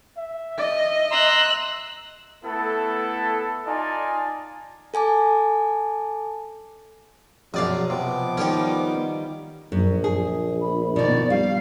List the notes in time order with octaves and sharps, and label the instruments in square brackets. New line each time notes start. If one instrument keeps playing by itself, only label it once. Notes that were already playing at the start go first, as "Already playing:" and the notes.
[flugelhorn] E5
[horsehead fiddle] D#5
[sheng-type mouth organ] A#5 C6 [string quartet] E6 F#6
[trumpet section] A3 B3 E4 A4
D#4 F4 D5 G#5 A5
[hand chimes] A4 G#5 A5 D6
[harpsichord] A#1 D5 F5 [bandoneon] F#2 [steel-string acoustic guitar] B2 D#5 [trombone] F#3
[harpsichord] C3 [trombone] F3 [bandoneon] B3 D6
[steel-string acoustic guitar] D#3 G3 D#4 [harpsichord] C#4 G4
[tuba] A#1 [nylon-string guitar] F#2
[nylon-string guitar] G#4
[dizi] B5
[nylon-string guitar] B2 D#3 [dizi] D5
[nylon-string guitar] G3 [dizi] F5